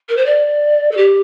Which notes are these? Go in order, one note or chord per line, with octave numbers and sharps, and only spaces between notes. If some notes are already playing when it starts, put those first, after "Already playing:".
A#4
C5
D5
A4
G4